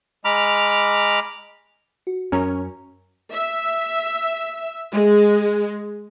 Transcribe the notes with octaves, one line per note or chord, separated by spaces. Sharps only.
G#3 A#5 B5 D6 F6
F#4
F#2 C#4 A#4
E5
G#3